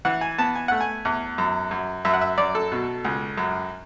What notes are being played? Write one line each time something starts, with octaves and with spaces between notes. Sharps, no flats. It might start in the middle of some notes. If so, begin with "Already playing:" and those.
E3 F#5
G#5
B3 A5
G#5
A3 F#5
G#5
E2
F#2
F#2
F#2 E5
F#5
E5
F#2 D5
A4
B2
C#2
F#2